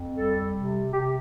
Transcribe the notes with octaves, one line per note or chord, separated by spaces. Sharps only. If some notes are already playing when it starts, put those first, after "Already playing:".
Already playing: F2
G3 A4
C3
C3 G4